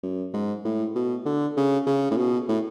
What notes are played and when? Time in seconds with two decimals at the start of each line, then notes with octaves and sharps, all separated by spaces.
0.03 F#2
0.34 G#2
0.64 A2
0.95 B2
1.25 D3
1.57 C#3
1.86 C#3
2.11 A2
2.17 B2
2.48 A2